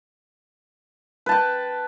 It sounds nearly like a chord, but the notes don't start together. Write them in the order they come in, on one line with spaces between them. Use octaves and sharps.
B4 A5 G5